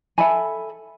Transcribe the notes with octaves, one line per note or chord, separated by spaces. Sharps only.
A4 E5 G#5 B5